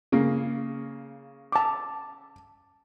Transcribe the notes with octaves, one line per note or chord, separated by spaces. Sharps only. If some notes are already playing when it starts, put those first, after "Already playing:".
C#3 A#3
A5 D6